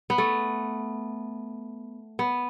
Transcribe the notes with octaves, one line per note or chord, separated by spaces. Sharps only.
B3
A3
B3